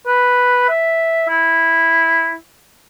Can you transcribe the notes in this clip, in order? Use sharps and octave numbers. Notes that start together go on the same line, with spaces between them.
B4
E5
E4